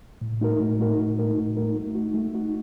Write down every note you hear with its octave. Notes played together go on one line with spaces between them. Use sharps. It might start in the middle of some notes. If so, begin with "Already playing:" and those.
A2
A3 D#4 F#4 A#4
A2
A3 D#4 F#4 A#4
A2
A3 D#4 F#4 A#4
A2
A3 D#4 F#4 A#4
A3
D#4 F#4
A3
D#4 F#4